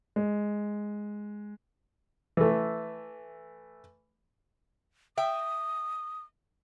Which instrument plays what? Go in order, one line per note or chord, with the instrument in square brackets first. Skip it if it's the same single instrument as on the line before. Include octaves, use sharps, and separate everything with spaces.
[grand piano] G#3
[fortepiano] E3 A3
[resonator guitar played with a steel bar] E5 G5 [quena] D#6